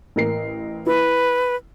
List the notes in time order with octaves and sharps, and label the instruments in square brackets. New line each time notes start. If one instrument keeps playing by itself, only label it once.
[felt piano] A1 A#4 C7
[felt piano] E4 [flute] B4